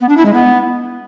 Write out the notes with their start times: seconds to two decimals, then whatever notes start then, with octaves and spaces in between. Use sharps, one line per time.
0.01 B3
0.09 D4
0.17 E4
0.26 G#3
0.34 B3